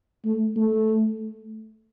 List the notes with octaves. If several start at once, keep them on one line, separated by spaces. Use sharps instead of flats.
A3
A3